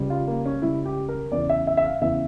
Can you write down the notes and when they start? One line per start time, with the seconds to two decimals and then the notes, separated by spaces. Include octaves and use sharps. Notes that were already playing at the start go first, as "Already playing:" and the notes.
Already playing: C#2 C#3 G3
0.10 F4
0.27 A#3
0.45 C#4
0.62 C#2 C#3 G3 E4
0.86 G4
1.09 A#4
1.31 E2 C#3 E3 D5
1.49 E5
1.67 E5
1.77 E5
1.84 F5
2.01 E2 C#3 E3 E5